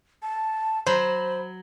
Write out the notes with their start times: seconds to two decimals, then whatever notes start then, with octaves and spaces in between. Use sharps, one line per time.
0.22 A5
0.87 F#3 C5 B5